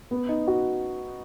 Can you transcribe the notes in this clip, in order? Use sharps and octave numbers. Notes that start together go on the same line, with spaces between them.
B3
D#4
F#4